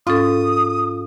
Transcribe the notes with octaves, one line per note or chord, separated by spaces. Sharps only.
G#2 C#4 F4 A4 D#6